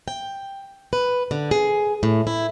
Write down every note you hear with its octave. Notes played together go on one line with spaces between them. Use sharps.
G5
B4
D3
G#4
A2
E4